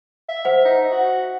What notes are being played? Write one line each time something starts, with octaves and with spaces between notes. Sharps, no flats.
E5
C5 F#5
D#4
F#4